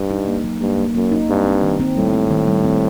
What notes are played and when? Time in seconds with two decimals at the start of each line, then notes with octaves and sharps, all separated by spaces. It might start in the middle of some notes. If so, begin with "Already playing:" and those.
Already playing: G2
0.11 D#4
0.27 A#3
0.44 F#3
0.61 G2 A#3
0.78 A#3
0.95 F#2 A#3
1.12 D#4
1.29 G2 C4
1.46 C4
1.63 D#3
1.80 C4
1.96 A2 G3
2.13 C4
2.30 D#3
2.48 G3
2.64 C4